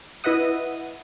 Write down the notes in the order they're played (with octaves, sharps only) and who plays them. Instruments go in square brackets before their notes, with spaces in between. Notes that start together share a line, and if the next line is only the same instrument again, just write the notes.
[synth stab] E4 B4 D#5 E5 F#5 D#6